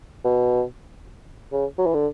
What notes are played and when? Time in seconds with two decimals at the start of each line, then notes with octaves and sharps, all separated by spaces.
0.24 B2
1.52 C#3
1.78 F#3
1.86 E3
1.94 D3